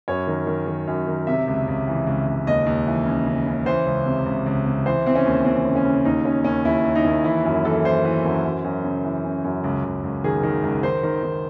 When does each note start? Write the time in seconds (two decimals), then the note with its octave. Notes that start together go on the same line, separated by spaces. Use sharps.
0.08 F#2 C#5
0.27 D#3
0.47 D#3
0.67 D#3
0.88 F#2
1.07 D#3
1.27 C3 E5
1.48 C#2
1.68 C#2
1.88 E3
2.07 C#2
2.27 C#2
2.47 D#2 D#5
2.66 D#2
2.87 E3
3.06 C#3
3.26 C#3
3.46 C#3
3.66 E3 C5
3.86 C#2
4.06 C3
4.26 C#2
4.46 C#2
4.66 C3
4.86 E3 C5
5.06 E3 C4
5.15 C#4
5.26 D#2
5.45 E3 C4
5.65 C#3
5.76 C#4
5.85 C#3
6.05 D#2 D#4
6.25 C#3 C#4
6.45 D#2 C#4
6.65 D#2 E4
6.84 D#2
6.95 D#4
7.04 D#2
7.24 E3 E4
7.45 F#2
7.65 E3 A4
7.84 E3 C5
8.05 E3
8.25 F#2
8.44 F#2
8.64 F#2
8.85 C#3
9.04 E3
9.24 C#3
9.44 F#2
9.64 C#2
9.84 C#2
10.04 C#2
10.24 D#3 G#4
10.43 D#3
10.63 C#2
10.83 D#3 C5
11.03 D#3
11.23 D#3